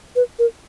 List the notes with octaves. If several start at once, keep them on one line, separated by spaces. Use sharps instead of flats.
B4
A#4